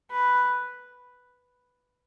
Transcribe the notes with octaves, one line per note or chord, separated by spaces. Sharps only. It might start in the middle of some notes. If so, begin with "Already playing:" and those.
B4